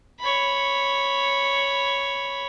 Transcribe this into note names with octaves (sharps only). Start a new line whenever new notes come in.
C#5 B5